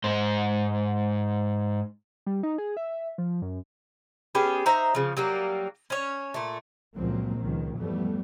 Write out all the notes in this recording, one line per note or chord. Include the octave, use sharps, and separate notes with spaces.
G#2 C5
G3
D#4
G#4
E5
F3
F#2
B3 C#4 G4 G#4
D#4 C5 E5 A#5
C#3 F3
F#3 G3 A#3
C#4 C#5
A#2 A3
C#2 A#2 F3 F#3 A#3 C4
C#2 D#3 F3
F2 G#2 E3 G3 A3 B3